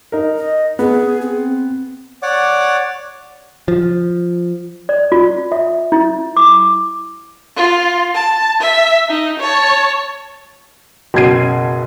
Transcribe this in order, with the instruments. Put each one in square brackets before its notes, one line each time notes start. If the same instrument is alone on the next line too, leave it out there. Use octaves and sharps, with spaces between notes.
[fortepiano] D#4 A#4
[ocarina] D#5
[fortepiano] B3 [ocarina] G#4
[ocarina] C4
[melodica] C#5 D5 F#5 D6
[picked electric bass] F3
[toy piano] D5
F4
E5
E4
D6
[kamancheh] F4
A5
E5
D#4
C#5 A5
[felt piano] F#1 B2 C#4 G#6 C7 D#7